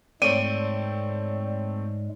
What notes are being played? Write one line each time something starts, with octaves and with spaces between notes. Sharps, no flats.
G#2 G#3 A3 C4 C#5 D5 D#7